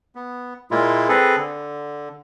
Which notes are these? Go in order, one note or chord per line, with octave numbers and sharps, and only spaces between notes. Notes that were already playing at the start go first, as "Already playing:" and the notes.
B3
A#2 G#3 A#3 E4 F4
C4 G#4 A4 B4
D3